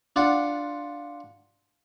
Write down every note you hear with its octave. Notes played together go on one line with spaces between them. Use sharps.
D4 F4 D5 F#5